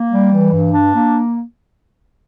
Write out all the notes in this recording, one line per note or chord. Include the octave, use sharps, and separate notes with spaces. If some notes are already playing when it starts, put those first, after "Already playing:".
Already playing: A#3
G3
E3
G2
D4
A#3